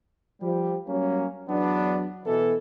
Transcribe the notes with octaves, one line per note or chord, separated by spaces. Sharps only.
F3 G3 G4
F#3 G3 A#3 C#4
E2 F#3 B3 D4
B2 E3 A4